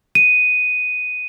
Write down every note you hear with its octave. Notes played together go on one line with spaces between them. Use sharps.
D#7